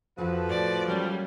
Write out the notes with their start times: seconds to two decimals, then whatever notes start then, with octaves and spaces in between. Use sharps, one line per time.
0.18 F2 F3 F#4 G4 A4 B4
0.49 A2 D5
0.88 F#3 G3 A#3 C#4